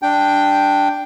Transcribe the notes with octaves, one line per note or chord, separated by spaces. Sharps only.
D4 G5